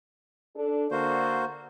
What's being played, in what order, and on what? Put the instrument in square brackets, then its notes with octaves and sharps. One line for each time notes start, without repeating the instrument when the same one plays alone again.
[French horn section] D4 A4
[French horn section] D3 [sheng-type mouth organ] A#3 F#4 C5